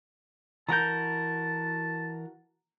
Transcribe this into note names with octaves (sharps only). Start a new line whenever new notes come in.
E3 F#4 A#4 A5 A#5 G6